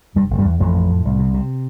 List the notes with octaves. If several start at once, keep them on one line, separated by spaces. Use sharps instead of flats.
F1 G2 G3
F1
G2 G3
E2
A1 F2 F3
A2
A2
C2
C3
C3